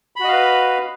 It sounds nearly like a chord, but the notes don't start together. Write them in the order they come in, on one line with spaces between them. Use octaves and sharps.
B5 F#4 D#5 F5 B4